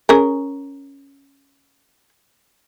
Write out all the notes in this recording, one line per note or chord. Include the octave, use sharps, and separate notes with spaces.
C#4 G#4 A#4